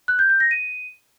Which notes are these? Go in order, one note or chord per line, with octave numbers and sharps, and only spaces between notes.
F#6
G6
G6
A#6
D#7